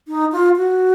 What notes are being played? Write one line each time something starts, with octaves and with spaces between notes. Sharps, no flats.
D#4
F4
F#4